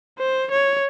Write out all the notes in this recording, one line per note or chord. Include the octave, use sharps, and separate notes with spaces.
C5
C#5